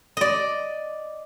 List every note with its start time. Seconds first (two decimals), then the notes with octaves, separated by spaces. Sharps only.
0.17 D5 D#5